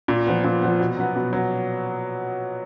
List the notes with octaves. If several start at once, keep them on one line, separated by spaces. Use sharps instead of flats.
A#2
F3 B3
A#2
F3 B3
B2
F#3 B3
B2
F#3